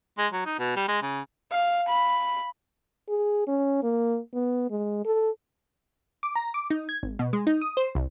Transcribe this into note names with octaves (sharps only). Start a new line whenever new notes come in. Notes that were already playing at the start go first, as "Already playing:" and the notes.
G#3
F#3
D#4
B2
G3
G#3
C#3
F5
B5
G#4
C#4
A#3
B3
G#3
A4
D6
A#5
D6
D#4
G#6
G#1
B2
G#3
D#4
D#6
C5
C2